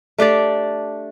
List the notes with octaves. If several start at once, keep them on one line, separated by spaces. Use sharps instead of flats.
A3 D4 G4 D5